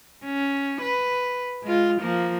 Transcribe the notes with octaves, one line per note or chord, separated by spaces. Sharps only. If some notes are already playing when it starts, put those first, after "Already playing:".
C#4
B4
G#3 F4
F3 A#3